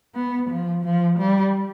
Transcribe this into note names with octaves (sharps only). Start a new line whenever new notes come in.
B3
F3
F3
G3